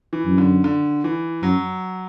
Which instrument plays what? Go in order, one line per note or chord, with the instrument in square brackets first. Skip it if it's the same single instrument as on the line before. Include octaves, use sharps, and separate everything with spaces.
[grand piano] E3
[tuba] F#2
[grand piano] D3
D3
E3
[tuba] F#2 [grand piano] F#3